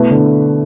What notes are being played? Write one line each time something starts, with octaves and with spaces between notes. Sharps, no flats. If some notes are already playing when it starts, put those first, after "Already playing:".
Already playing: B2 A3 E4 B4
D3